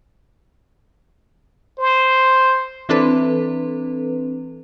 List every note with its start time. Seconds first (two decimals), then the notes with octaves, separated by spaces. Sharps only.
1.79 C5
2.89 E3 C4 D4 A4 B4